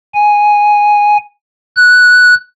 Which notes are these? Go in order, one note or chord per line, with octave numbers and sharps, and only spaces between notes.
G#5
F#6